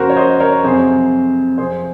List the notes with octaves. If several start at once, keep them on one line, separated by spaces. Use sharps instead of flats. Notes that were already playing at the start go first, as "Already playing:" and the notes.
Already playing: F#2 C#3 F3 A#3 F#4 A#4 C5
C#5
C5 D#5
A#4 C#5
F2 C3 F#3 G#4 C5
F2 C3 F3 G#4 C5